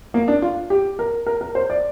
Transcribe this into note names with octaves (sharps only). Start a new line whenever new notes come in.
A#3
D4
F4
G4
A#4
A#4
A#4
C5
D5